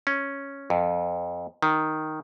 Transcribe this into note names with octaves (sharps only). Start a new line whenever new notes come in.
C#4
F2
D#3